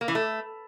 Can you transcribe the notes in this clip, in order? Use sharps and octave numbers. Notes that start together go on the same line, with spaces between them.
A#3
E3
A3